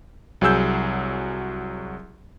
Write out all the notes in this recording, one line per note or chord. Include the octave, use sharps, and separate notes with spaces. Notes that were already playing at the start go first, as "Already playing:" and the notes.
C2 F#3 G#4 E6 G6